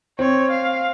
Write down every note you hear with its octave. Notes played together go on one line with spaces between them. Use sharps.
C4 C#5
F5